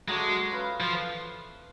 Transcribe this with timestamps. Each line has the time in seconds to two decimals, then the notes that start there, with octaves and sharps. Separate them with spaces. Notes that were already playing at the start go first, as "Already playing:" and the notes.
0.08 F#3 G#3 A3 D4 F#4
0.51 C#4 F4 B4 F5
0.80 F3